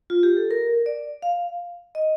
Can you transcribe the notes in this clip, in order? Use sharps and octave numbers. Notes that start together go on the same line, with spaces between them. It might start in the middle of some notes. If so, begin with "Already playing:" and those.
F4
G4
A4
A#4
D5
F5
D#5